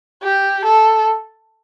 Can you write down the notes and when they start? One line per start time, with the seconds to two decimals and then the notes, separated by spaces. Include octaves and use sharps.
0.23 G4
0.65 A4